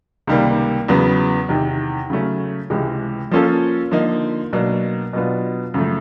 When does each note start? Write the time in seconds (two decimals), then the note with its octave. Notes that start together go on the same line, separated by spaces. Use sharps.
0.27 C#2 C3 D#3 G3 A#3
0.88 E2 C#3 F#3 B3
1.49 E2 C3 D#3
2.10 C#3 F#3 A3 C#4
2.70 C#2 C3 E3 G#3
3.31 F3 A#3 C#4 F4 A4
3.91 D3 F3 A#3 D#4
4.53 B2 F#3 A#3 D4
5.13 B2 F#3 B3 D4 F4
5.74 F#2 C#3 F3 A3